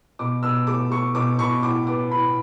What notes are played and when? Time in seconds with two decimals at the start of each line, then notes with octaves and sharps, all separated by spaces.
0.19 B2 D6
0.43 B2 E6
0.67 A3 D6
0.91 A3 C#6
1.15 B2 D6
1.39 B2 C#6
1.63 A2 D6
1.87 B3 D6
2.11 A2 B5